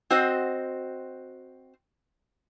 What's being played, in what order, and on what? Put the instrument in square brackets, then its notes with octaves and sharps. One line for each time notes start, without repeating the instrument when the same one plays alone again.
[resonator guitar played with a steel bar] C4 F#4 C5 D#5